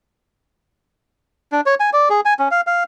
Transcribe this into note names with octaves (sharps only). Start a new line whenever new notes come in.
D4
C#5
G#5
D5
G#4
G#5
C#4
F5
F5